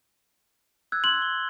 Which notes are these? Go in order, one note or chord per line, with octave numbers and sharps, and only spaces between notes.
E6 F#6 G#6
C6 F#7
G7